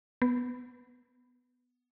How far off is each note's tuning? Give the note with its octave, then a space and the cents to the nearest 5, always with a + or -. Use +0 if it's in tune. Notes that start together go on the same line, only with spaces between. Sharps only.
B3 +5